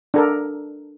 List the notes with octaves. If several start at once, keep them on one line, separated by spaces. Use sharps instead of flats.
D4 A4 A#4